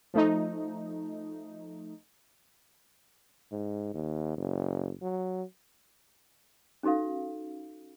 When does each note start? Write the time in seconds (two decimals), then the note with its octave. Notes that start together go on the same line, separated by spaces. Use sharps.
0.14 F3 A3 D#4
3.52 G#2
3.94 D#2
4.38 F#1
5.02 F#3
6.83 C#4 D#4 F#4 A4 F5